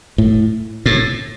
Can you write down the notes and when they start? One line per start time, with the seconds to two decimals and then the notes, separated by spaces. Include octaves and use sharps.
0.18 A2
0.86 A2